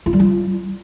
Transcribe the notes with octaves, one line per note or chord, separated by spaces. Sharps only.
F4
G3
F4